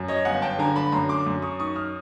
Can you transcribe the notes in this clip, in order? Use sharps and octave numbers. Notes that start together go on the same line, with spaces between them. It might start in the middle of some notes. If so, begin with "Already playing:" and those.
Already playing: F#2
C#5 D#5
G1 F#5 G#5
G5 A5
D3 G#5 A#5
A5 B5
F#2 A#5 C6
C6 D6
F#2
C#6 D#6
D#3 C#6 D#6
D#6 F6